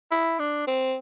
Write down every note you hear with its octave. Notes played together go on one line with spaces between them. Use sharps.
E4
D4
C4